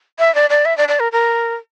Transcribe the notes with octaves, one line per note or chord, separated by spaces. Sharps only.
E5
D5
D5
E5
D5
D5
A#4
A#4